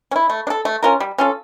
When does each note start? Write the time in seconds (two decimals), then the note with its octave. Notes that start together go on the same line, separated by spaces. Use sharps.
0.11 C#4
0.16 E4
0.30 A3
0.47 D4
0.50 A4
0.65 A3
0.83 C#4 F4 A#4
1.00 G3
1.18 C#4 F4 A4